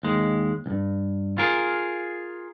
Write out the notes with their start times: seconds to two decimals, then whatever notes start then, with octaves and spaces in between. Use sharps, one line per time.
0.03 D#2 G#3
0.66 C2 G2
1.38 F4 G#4 A#4